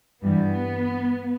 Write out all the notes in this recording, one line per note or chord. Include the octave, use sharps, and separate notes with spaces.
G2 E3 G3 B3